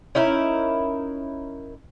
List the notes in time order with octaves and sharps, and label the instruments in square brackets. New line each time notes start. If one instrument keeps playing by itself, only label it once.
[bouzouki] C#4 D#4 E4 A#4